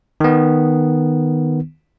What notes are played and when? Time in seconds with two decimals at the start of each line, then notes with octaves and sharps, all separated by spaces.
0.20 D#3 B3